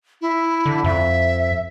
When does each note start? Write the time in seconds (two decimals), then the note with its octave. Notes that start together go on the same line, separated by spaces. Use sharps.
0.21 E4
0.66 D3
0.84 F2 E5